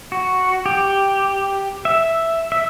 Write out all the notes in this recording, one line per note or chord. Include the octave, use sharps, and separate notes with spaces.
F#4
G4
E5
E5